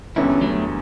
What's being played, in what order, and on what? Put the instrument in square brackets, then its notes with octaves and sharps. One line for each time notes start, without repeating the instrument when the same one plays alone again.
[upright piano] E1 E2 D3 G3 B3 [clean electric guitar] C#4 E4
[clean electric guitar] F#3 A3